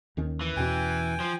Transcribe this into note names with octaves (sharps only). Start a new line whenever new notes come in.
D#2 D#3 C#4
E3
E2 B2 C#4 G5 G#5
F3